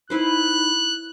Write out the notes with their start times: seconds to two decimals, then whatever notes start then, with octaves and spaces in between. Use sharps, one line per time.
0.10 D#4 E4 B4 C5 F#6